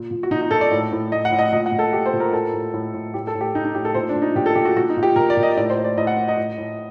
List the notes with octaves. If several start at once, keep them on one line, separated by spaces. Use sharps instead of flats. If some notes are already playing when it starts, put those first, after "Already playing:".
Already playing: A#2
A#2
F#4
A#2 D#4
D#4
A#2 A4
D5
A2
A2
A2 D#5
F#5
A2
D#5
A#2 D#5
F#5
A#2
A4
A#2 G4
C5
A#2
A#4
A2 A4
A2
A2
A2
A2 G4
A4
A2
G4
A2 D#4
D#4
A2 G4
A4
A#2 C5
D4
A#2
D#4
A#2 G4
A4
A#2 G4
F#4
A#2 F#4
D#4
A#2
G4
A#2 A#4
D5
A#2
D#5
A2 D5
C5
A2
D5
A2 D#5
F#5
A2
D#5
A2
A2